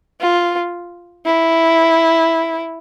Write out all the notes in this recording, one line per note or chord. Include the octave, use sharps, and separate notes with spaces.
F4
E4